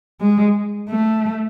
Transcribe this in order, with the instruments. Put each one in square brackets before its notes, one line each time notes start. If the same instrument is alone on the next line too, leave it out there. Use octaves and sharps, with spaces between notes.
[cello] G#3
A3